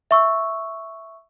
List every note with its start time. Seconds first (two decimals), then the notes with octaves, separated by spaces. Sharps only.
0.11 E5 C#6 E6